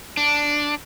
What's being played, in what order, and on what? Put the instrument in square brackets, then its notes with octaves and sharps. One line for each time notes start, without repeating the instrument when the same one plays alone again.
[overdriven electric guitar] D4